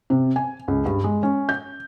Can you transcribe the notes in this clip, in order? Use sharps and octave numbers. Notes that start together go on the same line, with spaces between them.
C3
G#5
C#2
G2
G#3
C#4
G6